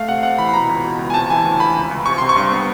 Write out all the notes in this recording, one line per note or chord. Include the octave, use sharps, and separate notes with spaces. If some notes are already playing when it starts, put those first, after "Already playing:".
Already playing: A3 F5
C3 F#5
C3 F#5
E3 B5
B5
B2 A#5
C#2
B2
C#2
G#5
C3 A5
E3 G#5
D2
D2 B5
C#2
C#2
C3 C#6
C3 C6
C#6
G2
B3